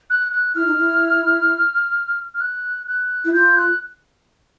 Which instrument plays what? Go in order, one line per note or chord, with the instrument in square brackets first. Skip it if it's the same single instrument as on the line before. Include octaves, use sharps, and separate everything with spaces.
[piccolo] F#6
F#6
[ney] E4 [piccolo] F6
[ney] D#4
E4
[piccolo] F6
F#6
F#6
[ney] E4
[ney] F4 [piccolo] G6
[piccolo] F#6